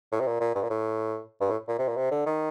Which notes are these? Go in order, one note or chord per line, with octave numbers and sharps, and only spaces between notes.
A2
C3
A#2
A#2
G2
A#2
A2
G2
A2
A#2
C3
A#2
C3
D3
D#3